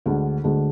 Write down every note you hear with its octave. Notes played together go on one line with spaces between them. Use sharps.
D2 D3 G#3 D4
D2 D3 G#3 D4